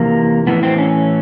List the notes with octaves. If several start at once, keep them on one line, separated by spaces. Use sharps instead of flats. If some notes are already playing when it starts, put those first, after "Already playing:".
Already playing: F2 C3 E3 A#3
A2 E3 B3
C4
C#4